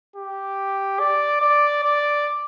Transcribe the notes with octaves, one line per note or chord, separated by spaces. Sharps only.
G4
D5
D5
D5